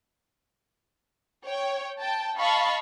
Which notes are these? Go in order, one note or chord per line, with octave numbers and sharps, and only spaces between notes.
C#5 G5
G5 A5
D#5 F5 A5 B5 C#6